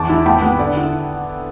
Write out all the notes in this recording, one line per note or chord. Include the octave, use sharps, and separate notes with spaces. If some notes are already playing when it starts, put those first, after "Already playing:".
Already playing: E2 A5 D6
E4
B3 G5 B5
B3
D3 D5
E4